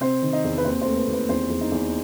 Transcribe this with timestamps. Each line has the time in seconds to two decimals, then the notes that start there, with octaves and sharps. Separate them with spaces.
0.01 C3 C4 C5
0.23 D#3
0.33 D#4 D#5
0.44 E2
0.58 B4
0.65 D#2 C4 C5
0.81 A3 C4 C5
0.97 B4
1.07 D#2
1.13 B4
1.29 E2 C4 C5
1.50 E2
1.61 D#4 D#5
1.72 E2